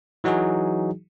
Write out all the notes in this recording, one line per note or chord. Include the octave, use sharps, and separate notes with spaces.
E3 F#3 D#4 F#4 G#4